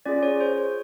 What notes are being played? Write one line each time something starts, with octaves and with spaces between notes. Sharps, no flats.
C#4 F4 G#4 D5
C#5
C5
C#5